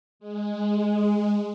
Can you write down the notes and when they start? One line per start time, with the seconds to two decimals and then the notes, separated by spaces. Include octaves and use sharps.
0.20 G#3